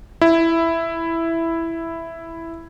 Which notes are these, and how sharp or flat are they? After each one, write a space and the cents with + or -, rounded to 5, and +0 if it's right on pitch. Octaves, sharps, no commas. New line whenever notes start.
E4 +5